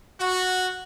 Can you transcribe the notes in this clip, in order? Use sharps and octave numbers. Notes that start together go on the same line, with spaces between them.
F#4